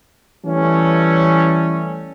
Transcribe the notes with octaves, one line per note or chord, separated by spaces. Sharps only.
E3 G3 A3 C#4